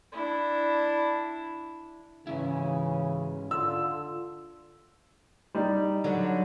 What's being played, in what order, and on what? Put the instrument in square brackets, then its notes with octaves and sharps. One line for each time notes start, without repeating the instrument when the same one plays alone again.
[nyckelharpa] D4 E4
[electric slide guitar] G#2 C#4 E4 [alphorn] C#3 [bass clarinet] E3
[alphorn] D3 [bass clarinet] F4 [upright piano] E6
[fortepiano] G3 D#4
[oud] D3 F#3 D4